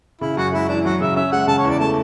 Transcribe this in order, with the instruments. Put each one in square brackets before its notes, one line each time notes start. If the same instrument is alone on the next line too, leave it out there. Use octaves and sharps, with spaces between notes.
[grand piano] C#3 [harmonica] E4
[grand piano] F#2 [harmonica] F#4
[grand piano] G#3 [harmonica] E4
[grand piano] E3 [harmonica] D4
[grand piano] F#3 [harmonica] F#4
[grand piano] C#3 [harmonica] E5
[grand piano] C#4 [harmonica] E5
[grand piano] G#3 [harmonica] F#5
[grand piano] C#3 [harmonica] A5
[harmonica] C#5
[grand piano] E2
[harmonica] D5
[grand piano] A3 [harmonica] A5